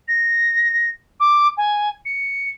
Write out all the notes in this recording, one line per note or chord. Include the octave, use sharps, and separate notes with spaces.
A#6
D6
G#5
C#7